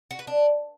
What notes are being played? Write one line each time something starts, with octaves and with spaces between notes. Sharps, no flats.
F#4
B4
D4